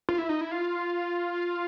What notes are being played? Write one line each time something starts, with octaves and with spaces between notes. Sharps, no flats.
F4
E4
D#4
E4
F4